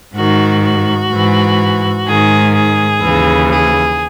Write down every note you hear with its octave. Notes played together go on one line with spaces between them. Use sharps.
G#2 D#3 F#4
F#4
G#2 E3
G#2 D#3 G#4
G#4
D#2 C#3 E3
G#4